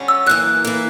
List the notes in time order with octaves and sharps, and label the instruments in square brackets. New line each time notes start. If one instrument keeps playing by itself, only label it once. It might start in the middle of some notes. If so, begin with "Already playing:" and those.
Already playing: [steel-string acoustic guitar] D3 G3 C#4
[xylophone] E6
[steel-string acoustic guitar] F#2 E3 A#3 [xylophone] F#6
[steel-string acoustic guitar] E3 A#3